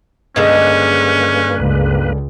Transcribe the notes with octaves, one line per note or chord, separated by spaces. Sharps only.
G2 D3 D#3 G#3 A#3 C#4 B4
C#2